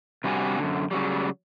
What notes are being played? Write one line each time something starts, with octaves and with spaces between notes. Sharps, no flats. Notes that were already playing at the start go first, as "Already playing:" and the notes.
C3 G3 D4 F#4 G#5
F#2 D3
C#3 F#3 G3